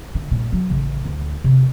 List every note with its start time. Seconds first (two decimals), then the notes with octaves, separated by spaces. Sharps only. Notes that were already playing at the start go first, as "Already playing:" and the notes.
0.15 D3
0.31 G2 A#2
0.52 F#3
0.70 A1 C#3
1.06 D2
1.44 C3 C4